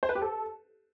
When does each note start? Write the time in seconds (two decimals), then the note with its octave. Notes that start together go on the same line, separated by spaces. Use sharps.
0.03 C5
0.09 B4
0.15 G4
0.22 A4